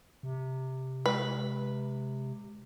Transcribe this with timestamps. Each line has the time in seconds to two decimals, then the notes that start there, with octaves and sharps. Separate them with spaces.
0.23 C3
1.06 G#3 B4